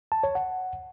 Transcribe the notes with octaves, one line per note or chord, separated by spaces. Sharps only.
A5
C#5
F#5